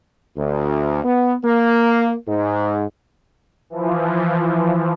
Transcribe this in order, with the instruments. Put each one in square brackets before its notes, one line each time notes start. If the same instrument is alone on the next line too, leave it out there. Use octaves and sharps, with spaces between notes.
[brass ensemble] D2
B3
A#3
G#2
[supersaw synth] E3 F3